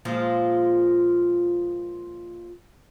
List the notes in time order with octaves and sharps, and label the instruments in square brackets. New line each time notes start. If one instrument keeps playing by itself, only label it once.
[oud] A#2 F3 G#3